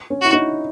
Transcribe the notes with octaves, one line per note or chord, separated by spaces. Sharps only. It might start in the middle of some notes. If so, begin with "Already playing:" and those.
C#4
E4 F#4
D#4